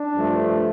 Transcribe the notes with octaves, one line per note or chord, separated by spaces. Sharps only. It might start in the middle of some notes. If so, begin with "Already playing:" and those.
Already playing: D4
G2 F3 A3